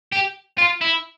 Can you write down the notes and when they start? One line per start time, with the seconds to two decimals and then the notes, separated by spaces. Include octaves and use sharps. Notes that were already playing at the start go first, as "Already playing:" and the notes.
0.12 G4
0.58 F4
0.81 E4